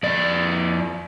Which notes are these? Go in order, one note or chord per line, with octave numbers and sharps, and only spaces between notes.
F2 D5